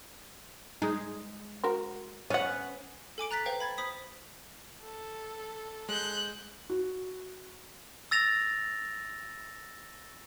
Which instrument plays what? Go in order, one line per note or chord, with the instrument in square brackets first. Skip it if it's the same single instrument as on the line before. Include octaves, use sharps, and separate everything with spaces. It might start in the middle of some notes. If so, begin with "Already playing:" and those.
[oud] G#3 [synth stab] D#4 G#4
[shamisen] F#4 A#4 C5
[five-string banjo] B3 F#5 [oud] C#4
[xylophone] A4 G#5 D6 D7
A#5 F#6 A6 B6
B4 C5 F5 G5
B5 G#6 A6
C5 B5 D#6 B6
[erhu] A4
[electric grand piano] G#3 [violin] F#6 G6
[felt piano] F#4
[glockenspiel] E6 A6 A#6 F7